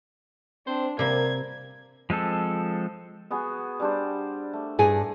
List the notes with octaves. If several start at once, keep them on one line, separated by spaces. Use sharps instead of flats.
C4 D4 C5
C3 G3 A#3 A#4 G#6
F3 G#3 C4 A4
B3 F#4 G#4
G3 D4 C5
A3
G2 G#4 G#5